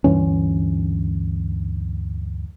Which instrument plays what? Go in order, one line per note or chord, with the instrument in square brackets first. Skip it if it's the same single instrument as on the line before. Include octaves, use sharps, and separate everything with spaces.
[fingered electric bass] D2 G2 E3 C#4